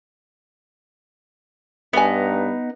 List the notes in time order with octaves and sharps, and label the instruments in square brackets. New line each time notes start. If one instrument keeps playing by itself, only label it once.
[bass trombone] G2 [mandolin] B3 D#4 [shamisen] E5 G#5